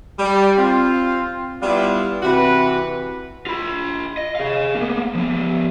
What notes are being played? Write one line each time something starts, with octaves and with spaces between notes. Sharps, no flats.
G3
C4 F4
G3 B3 D4 E4 F4
C3 E3 F#4 B4
F4 B5
D#5
G#4 F5
A#3 B3
F3 B3